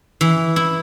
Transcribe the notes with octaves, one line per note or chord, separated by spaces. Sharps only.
E3
E4